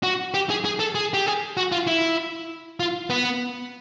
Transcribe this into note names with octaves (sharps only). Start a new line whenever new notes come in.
F#4
G4
G#4
G#4
A4
G#4
G4
G#4
F#4
F4
E4
F4
B3